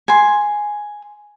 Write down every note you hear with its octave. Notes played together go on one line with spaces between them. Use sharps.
G#5 C6